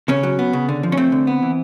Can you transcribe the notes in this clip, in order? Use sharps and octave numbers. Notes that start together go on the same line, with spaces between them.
C#3 C#4
F#3
B3
C#3
D3
F3
C#4
A3 C4
D3
B3
E3